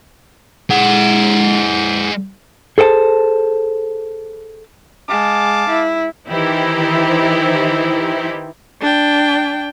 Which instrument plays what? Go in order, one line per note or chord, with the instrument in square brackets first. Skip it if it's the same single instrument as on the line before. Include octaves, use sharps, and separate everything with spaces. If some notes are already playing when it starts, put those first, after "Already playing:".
[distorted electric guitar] G#3 F#5
[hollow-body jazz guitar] G#4 A4 C5 G5 A5
[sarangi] G#3 [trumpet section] F5 A5 D6
[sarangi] E4
[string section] D#3 E3 D#4 E4 G4 C5
[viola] D4 G5